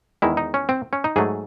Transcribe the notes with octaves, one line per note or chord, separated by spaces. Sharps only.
E2 D#3 G#3 E4
D#4
C#4
C4
C#4
D#4
G#2 F#3 A3 G#4